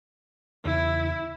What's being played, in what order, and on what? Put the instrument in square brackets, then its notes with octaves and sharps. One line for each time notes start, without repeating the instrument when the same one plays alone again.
[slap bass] E2 C#3 E3 [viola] E4